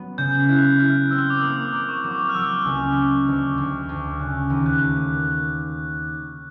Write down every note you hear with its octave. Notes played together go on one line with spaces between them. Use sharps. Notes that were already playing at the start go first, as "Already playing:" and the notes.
Already playing: F#3 B3
C#3 G6
E4 F#6
E4 F6
C4 E6
D6
A#3 D#6
D6
A#3
C#6
F#3
D6
F6
F#3 E6
C#2
F#3
D2
D2
D2
C#3 F#6
D#2
F#6
A3